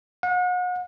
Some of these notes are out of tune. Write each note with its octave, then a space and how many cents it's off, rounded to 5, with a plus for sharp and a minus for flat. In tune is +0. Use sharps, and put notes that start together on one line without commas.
F#5 -40